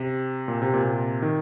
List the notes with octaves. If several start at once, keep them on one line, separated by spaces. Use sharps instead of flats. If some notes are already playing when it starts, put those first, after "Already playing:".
Already playing: C3
A#2
C3
A#2
C3
D#3